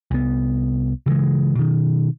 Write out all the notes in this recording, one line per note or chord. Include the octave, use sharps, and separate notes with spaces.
C2 B3
C#3 E3 G3 G#3
B2 D#3